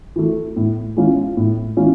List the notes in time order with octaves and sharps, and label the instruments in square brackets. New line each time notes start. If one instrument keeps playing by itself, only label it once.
[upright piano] E3 A3
A2
E3 G#3 C#4 F4
A2
E3 G#3 C#4 F4